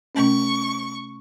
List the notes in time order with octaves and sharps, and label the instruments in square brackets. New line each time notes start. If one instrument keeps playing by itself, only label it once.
[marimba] C3 A3 C#4 [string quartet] C#6